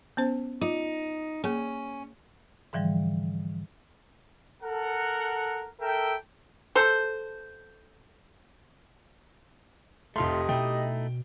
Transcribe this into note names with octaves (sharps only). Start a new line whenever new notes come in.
B3 C#4 C5
D#4 F4
A#3 C#4 G#4
G#2 D3 E3 F3 G3
A4 A#4 F#5
A4 A#4 E5 G5
A4 C5
F1 A3 F4 G4 A4 D#5 C6
B2 A3 D#4 E4 G5